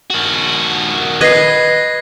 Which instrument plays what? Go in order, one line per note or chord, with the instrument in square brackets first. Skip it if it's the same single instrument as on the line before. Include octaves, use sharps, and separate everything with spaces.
[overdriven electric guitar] D#3 F#4
[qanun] B4 D#5 [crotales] G#6 A#6 C7